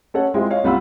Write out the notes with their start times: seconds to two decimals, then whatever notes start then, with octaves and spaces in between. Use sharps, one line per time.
0.14 C#4 A4 C#5 F#5
0.34 G#3 C4 E4 F4 G4 G#4
0.50 C#5 D#5 F5
0.64 C2 G3 F4 F#5 B5 E6